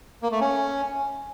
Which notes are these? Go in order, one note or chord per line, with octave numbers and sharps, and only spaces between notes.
A#3
A3
C#4